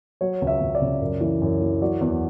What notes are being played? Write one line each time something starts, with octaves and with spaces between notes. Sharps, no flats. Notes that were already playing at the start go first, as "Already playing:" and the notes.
F#3 C#5
C#2
E5
C#2
D5
C#3
F#2
E3
F#2
E3
F#3 D5
E2